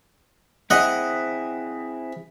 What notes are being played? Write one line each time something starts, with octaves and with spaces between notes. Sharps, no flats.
C4 E4 G#4 D#5 F#5